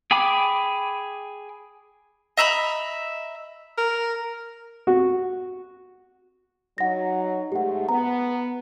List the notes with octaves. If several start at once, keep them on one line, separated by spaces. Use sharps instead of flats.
G#4 G5 G#5 B5 D6
D#5 E5 A#5 B5
A#4
F#4
F#3 D#4 F#5 A#6
G#2 A3 G4 F#5
B3 A#5